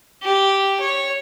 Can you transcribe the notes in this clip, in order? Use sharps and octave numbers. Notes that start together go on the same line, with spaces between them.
G4
C#5